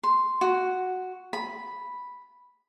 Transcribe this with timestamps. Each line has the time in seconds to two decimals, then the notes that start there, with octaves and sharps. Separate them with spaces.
0.03 C6
0.41 F#4
1.33 B5